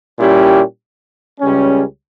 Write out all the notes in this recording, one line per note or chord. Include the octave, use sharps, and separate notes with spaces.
A#2 G3 C#4 E4 G4
C#2 C#3 G3 C#4